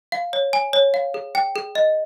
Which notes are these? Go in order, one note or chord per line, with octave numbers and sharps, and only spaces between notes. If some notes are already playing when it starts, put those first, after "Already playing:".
F5
C#5
G#5
C#5
F5
G#4
G5
G#4
D#5